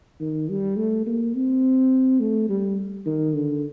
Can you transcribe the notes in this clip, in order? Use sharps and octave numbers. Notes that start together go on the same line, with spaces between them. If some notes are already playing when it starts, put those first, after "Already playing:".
D#3
G3
A3
A#3
C4
A3
G3
D#3
D3